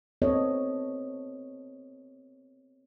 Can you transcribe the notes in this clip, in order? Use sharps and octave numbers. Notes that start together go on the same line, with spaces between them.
B3 C4 A4 C#5 D#5